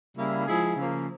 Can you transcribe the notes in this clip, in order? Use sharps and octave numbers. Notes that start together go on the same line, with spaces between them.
C#3 G3 A#3 E4
F3 G#3 E4 G#4
C#3 F3 A#3